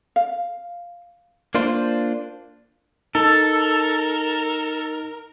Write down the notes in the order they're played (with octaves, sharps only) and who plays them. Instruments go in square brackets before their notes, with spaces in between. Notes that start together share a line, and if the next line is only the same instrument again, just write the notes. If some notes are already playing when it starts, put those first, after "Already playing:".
[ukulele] F5
[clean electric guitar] A#3 D4 F4 C5
[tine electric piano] D#4 [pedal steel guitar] A4 [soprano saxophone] A#4